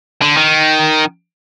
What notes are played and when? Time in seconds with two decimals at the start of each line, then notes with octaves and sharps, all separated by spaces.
0.22 D3
0.37 D#3